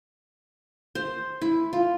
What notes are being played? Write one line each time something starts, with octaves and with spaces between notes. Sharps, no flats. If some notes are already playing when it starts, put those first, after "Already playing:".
C5
E4
F4